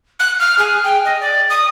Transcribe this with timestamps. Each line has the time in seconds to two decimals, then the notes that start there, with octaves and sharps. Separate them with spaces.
0.19 F#6
0.40 F6
0.58 G#4
0.84 G5
1.05 D#5
1.21 D5
1.50 D#6